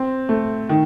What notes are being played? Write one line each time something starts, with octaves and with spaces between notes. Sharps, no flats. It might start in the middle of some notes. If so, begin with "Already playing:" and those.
Already playing: C4
A3
D#3